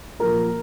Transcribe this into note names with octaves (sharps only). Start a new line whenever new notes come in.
A#2 F3 A#4